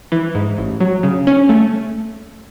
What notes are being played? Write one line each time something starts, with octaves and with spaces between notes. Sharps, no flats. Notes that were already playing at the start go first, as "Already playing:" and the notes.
E3
G#2
A1
F#3
C#3
C#4
A3